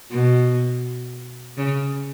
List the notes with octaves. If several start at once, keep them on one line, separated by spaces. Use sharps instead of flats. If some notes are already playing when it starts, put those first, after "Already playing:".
B2
C#3